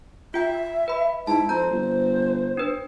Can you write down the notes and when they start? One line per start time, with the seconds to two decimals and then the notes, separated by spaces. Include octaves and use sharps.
0.34 F4 E5 G5
0.88 B4 B5
1.27 G#2 E4 A5
1.49 F2 C5 A#5 G6
1.71 G1
2.57 D4 B4